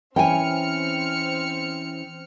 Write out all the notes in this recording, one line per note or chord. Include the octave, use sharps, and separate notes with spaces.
E3 C4 C#4 E4 G5 G#5 F6 C#7